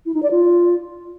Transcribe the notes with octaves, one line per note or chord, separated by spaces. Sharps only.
E4
D#4
D5
F4